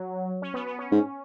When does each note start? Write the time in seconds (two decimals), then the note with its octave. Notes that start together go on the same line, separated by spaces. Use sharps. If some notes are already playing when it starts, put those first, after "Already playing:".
Already playing: F#3
0.42 C#4
0.54 B3
0.66 B3
0.79 C#4
0.92 G#2